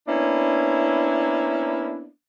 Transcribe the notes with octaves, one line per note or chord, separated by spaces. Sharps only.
A#3 B3 C#4 D4 E4